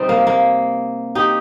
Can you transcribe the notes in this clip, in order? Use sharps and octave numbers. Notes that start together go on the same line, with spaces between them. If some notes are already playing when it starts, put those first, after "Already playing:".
Already playing: C3 G3 C4 D#4
A#3
A#3
D#4 G4